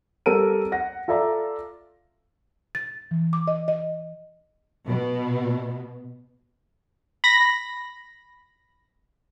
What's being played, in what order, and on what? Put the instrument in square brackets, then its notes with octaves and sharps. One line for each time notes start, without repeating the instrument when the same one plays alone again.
[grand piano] G3 C4 A4 A#4 D7 D#7
F#5 A#6
F4 A4 D5 E5 A#5 D6
[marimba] A6
E3
D6
D#5
D#5
[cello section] B2
[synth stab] B5 A#6